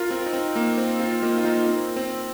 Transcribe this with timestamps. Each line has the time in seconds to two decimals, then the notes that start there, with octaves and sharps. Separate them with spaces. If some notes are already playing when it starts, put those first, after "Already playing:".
Already playing: F4 A#4
0.10 C4 F4
0.26 D#4
0.33 C4
0.56 A#3
0.78 C4
1.00 C4 F4
1.13 C4
1.23 A#3 D#4
1.38 F4
1.45 A#3 D#4
1.67 C4
1.96 C4